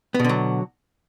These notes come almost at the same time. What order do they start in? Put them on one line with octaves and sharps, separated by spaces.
B3 B2 D3 F#3